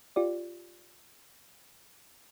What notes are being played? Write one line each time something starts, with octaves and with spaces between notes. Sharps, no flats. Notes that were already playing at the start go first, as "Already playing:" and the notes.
F4 G4 D5